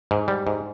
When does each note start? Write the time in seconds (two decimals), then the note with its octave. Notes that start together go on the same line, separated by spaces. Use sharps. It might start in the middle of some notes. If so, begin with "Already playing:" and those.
0.11 G#2
0.28 G3
0.47 G#2